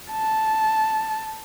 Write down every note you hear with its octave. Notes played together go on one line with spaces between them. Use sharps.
A5